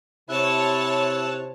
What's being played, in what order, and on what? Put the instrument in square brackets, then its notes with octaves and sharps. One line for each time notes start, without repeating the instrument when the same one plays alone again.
[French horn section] C3 [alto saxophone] E4 [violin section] C#5 A5 [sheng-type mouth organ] E6 F#6